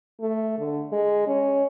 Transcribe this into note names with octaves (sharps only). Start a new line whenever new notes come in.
A3
D3
G#3
C#4